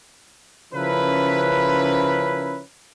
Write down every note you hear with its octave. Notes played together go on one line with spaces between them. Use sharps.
C#3 F3 C#4 E4 A#4 B4